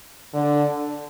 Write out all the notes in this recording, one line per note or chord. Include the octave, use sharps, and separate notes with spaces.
D3